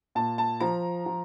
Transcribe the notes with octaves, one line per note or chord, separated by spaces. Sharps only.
A#2 A5
A5
F3 A#5
F3